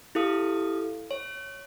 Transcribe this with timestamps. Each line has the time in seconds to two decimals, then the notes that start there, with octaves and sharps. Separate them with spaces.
0.15 E4 G4 A4 F5 D#6
1.11 C#5